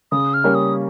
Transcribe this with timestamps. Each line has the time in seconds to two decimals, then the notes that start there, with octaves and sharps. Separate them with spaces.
0.12 C#3 D#6
0.34 F6
0.44 G3 A#3 C#4
0.55 D#6